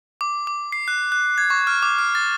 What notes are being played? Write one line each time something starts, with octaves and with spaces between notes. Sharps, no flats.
D6
D6
C7
F#6
F#6
G#6
C#6
F6
D6
F6
A6